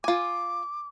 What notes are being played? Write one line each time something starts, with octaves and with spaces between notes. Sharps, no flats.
F4 G#5 D6